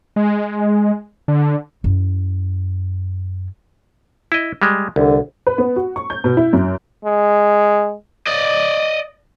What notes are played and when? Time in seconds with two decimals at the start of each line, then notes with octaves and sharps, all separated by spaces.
0.16 G#3
1.28 D3
1.84 F#2 E4
4.32 E4 D#5
4.62 G3 G#3
4.96 C2 D3
5.47 B4
5.58 B3
5.76 F#4
5.96 C#6
6.10 G6
6.24 B2
6.37 E4
6.53 F#2
7.05 G#3
8.27 D5 D#5